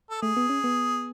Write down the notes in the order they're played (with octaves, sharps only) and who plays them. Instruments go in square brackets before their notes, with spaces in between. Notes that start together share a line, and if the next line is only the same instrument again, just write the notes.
[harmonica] A4
[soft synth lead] A3 [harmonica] G#4
[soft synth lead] B3
C#4
B3